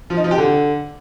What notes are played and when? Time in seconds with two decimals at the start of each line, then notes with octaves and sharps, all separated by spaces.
0.10 F3
0.17 D#4
0.24 F3
0.31 G4
0.38 D3